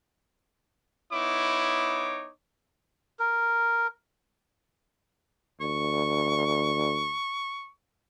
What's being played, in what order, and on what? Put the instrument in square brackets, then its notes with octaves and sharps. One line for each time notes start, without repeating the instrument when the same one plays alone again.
[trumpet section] B3 D#4 E4 C#5 D6
[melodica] A#4
[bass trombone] D2 [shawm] C#6